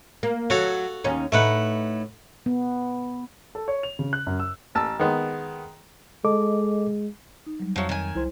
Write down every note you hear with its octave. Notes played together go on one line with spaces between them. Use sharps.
A#3
F#3 F#4 A4 F5
D#2 C#4 D#4
A2 A3 D#4 B4 F#5
B3
A4
C#5
F7
C#3
F#6
F#2
E6
A1 A5 E6
D#3 G#3 B3
G#3 A4 D#5 D6
D#4
F#3 G3
F2 F3 F#3 C#5 E5 F#5
D#3 G#5
C2 E4 C5 C6